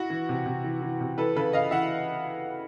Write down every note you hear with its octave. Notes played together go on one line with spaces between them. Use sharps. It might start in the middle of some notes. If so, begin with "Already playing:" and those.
Already playing: E4 F#4
E3
C3
C3
E3
E3
C3
E3 A4 B4
C#3 A4 B4
C#3 D#5 F5
E3 E5 F#5